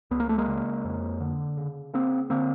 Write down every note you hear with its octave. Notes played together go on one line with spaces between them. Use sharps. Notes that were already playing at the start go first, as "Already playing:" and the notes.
C#2 B3
A#3
A3
G#3 A#3
C#3
F2
D3
C#3
C#3 A#3 C4
D3 A#3 C4